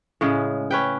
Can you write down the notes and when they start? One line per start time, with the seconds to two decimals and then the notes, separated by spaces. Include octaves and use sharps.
0.21 A2 C#3 G#3
0.71 C#4 B4 G5